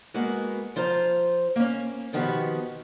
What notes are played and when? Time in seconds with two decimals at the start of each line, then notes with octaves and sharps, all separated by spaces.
0.14 G#3 A#3 B3 F#4
0.76 F3 F4 C5 A#5
1.56 A#3 C#4
2.13 B2 D#3 F3 B3 F#4 G4